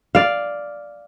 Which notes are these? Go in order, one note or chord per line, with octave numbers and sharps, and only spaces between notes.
D5 F5